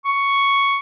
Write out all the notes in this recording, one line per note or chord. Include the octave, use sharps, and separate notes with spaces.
C#6